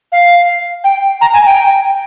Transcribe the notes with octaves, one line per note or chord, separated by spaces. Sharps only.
F5
G5
A#5
G#5
G5